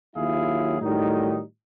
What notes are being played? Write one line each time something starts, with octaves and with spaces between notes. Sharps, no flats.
D#2 F#3 E4 F4 G#4 F5
A2 D#3 F#3 G3 D#4